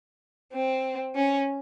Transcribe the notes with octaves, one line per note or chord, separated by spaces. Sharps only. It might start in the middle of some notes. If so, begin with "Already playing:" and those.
C4
C#4